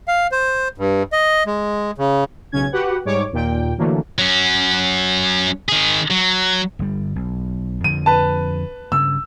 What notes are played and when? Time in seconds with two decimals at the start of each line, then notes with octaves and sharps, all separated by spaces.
0.08 F5
0.32 C5
0.78 G2
1.12 D#5
1.46 G#3
1.98 C#3
2.52 B1 C#3 C#4 G#6
2.72 F#4 G4 B4 F#5
3.05 G#2 G3 C#5 D6
3.32 D#2 A#2 G5
3.78 D3 E3 F#3 A3 A#3
4.19 F#3 C#4
5.69 D#3 G#4
6.11 F#3
6.79 G1 G3
7.16 B1
7.84 F2 D3 F3 D#7
8.06 B4 A5
8.92 G2 C#3 E6